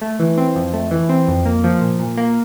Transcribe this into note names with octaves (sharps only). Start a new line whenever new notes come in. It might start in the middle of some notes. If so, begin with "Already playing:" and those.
A3
E3
C4
F2
A3
E3
C4
F2
A#3
F3
A#2
A#2
A#3